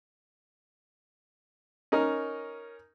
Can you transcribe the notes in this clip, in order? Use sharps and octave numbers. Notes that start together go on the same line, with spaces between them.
C#4 D#4 A#4